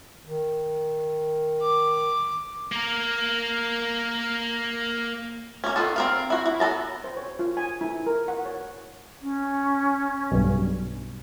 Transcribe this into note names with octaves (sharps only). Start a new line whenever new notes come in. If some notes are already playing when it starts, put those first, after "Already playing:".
D#3
D6
A#3 A#4
A#3 C#4
D#3 B3 F4 A4
C4 A#4 F5
E4 F#4
E4
B3 A4 A5 A#5
C5
C#5
F4
G#5
E4
A#4
F#5
C#5
C#4
B1 G2